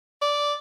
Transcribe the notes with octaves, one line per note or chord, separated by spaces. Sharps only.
D5